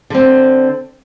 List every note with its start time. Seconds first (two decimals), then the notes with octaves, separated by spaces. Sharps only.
0.10 D3 C4